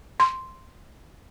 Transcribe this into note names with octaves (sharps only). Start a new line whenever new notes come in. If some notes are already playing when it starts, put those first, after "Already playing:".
C6